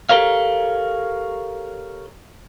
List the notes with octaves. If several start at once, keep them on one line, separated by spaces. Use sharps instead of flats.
G4 A4 A#4 C#5 F5